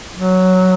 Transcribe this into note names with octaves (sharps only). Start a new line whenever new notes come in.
F#3